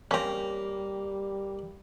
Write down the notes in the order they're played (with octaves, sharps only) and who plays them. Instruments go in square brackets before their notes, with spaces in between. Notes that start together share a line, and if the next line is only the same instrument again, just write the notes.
[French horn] G3 [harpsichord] A#3 A#5 [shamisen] C4 C#4